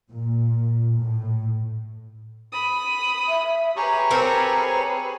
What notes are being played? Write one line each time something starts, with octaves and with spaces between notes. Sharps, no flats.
A#2
A2
B5 D#6
E5
G4 G#4 B4 C#5 A#5 C#6
C4 A4 A#4